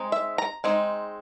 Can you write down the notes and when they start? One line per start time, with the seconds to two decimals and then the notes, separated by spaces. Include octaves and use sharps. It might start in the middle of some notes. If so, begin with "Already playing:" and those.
Already playing: G#3 C4 D#4
0.12 E5
0.38 A#5
0.64 G#3 C4 D#4